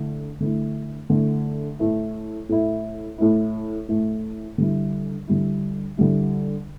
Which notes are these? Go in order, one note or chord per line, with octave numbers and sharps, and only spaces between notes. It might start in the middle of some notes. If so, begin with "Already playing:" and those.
Already playing: D3 A3 E4
D3 A3 E4
D3 A3 E4
A2 A3 E4
A2 A3 E4
A2 A3 E4
A2 A3 E4
D3 G3 E4
D3 G3 E4
D3 G3 E4